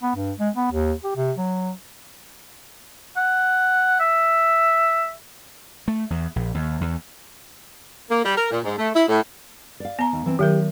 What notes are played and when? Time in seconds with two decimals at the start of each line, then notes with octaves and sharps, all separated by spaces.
0.03 B3
0.16 G2
0.39 G#3
0.56 B3
0.72 D#2
1.04 G4
1.16 C3
1.37 F#3
3.17 F#5
4.00 E5
5.88 A3
6.10 E2
6.36 A#1
6.54 D#2
6.81 E2
8.10 A#3
8.24 G3
8.37 A#4
8.51 A#2
8.64 G#2
8.78 A3
8.94 E4
9.08 A2
9.80 D5 F5
9.99 B3 A#5
10.13 D#2
10.26 E3 C4
10.39 D#3 F#3 G4 A#4